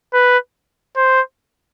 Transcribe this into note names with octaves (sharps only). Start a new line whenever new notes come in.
B4
C5